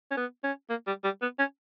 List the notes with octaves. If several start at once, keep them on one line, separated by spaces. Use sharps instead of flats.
C#4
B3
C#4
A#3
G3
G3
B3
C#4